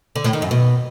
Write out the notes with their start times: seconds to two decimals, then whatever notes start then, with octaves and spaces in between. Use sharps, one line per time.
0.16 D3
0.24 A2
0.33 D#3
0.42 F#2
0.51 B2